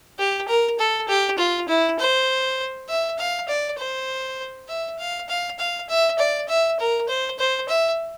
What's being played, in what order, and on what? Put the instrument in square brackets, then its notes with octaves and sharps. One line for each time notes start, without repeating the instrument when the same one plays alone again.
[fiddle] G4
A#4
A4
G4
F4
E4
C5
E5
F5
D5
C5
E5
F5
F5
F5
E5
D5
E5
A#4
C5
C5
E5